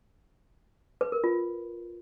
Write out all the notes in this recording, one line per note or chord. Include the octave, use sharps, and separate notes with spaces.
B4
A#4
F4